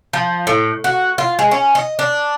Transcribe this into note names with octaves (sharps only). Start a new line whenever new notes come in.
F3
A2
F#4
F4
G#3
C#4
D#5
D4